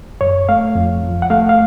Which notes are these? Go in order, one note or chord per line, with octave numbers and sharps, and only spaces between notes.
F#2 C#5
A3 F5
F2
F3
F#5
A3 F5
F5